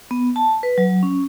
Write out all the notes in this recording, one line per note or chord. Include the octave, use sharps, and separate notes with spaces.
B3
A5
B4
F#3
C#4